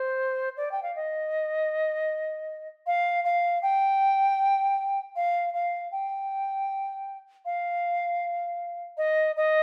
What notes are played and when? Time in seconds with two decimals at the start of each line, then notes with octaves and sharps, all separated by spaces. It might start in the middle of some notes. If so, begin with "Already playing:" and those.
Already playing: C5
0.57 D5
0.71 G5
0.83 F5
0.96 D#5
2.87 F5
3.25 F5
3.62 G5
5.16 F5
5.54 F5
5.92 G5
7.45 F5
8.97 D#5
9.36 D#5